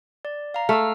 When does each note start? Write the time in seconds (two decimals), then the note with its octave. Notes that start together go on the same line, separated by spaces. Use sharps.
0.25 D5
0.54 F5 A#5
0.69 A3 E6 F6